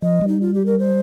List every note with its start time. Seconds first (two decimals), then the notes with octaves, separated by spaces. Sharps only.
0.02 F3 D#5
0.21 G3
0.28 D#4
0.41 F4
0.54 G4
0.66 A#4
0.79 C5